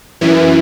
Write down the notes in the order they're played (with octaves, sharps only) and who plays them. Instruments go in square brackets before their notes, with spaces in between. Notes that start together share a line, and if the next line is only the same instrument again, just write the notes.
[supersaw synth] F#2 E3